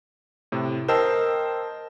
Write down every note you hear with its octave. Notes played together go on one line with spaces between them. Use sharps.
A2 C3
A#4 C5 D#5 G5 A5 E6